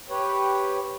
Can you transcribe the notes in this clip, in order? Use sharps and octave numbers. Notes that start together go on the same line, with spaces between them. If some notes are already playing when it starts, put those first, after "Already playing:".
G4 B4 C#5